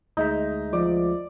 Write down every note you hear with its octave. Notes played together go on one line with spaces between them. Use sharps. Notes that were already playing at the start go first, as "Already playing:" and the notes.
D2 G#3 D#4 E5
F3 D5